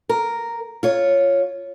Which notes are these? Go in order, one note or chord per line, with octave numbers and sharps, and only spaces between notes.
A#4
F4 C#5